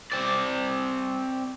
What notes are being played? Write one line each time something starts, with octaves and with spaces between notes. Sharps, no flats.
C4 D5